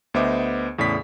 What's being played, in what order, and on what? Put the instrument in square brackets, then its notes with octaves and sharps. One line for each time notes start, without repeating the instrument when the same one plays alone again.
[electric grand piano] D2 B3 C5 D#5 E5 D6
E2 A2 C#3 D5 B6